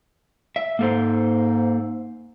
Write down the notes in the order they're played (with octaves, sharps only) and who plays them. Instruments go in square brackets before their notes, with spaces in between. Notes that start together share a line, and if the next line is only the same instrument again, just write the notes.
[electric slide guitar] E5
[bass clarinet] G#2 [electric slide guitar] A#3 A4 C5